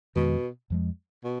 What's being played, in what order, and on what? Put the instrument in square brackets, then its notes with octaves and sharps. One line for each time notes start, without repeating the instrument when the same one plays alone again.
[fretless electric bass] F2 D#3 G#3 [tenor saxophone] B2
[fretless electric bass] F2 F3 G#3
[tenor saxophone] B2